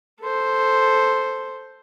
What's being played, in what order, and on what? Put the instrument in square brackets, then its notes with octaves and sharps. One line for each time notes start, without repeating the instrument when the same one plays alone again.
[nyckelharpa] A4 C5